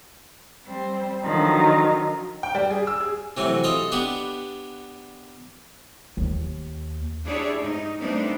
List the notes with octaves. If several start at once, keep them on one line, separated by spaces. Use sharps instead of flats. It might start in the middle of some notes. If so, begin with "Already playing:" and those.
G3 C4
D3 D#3 F3 F#3 D#4
G5
G3
G#4
E6
G#4
C3 E3 F#3 A3
F4 A4 D#5 A#5
B3 D4 G4 F#5
D#2
D4 E4 G4 G#4 C#5 D5
G#2 D#4
G3 A3 B3 C4 D4 D#4